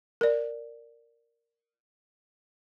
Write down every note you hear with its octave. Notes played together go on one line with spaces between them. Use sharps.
A#4 D5